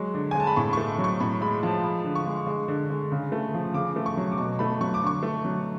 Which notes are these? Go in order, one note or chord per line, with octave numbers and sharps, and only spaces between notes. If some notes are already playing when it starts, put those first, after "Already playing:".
Already playing: F#3 G#3 C#6
D3
G#3 G#5
A5
B5
A2 C#6
A3 C#6
F#3
C#6
A2 B5
G#3 B5
F3 A5
G#3 B5
D3
C#6
G#3
G#3
D3
G#3
C#3
A3
F3
C#3 D6
A3
C#6
F#3
D6
B2 C#6
A3 B5
F#3 C#6
D6
D3 C#6
A3
F#3